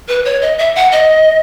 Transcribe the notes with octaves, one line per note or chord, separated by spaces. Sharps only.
B4
C#5
D#5
E5
F#5
D#5